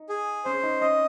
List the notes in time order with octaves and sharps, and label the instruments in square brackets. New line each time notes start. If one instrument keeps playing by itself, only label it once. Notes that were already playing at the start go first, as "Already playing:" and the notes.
Already playing: [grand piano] D#4
[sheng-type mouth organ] G#4
[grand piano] C#4 [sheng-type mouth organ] C5
[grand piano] D#4
[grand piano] C#4 [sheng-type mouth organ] D#5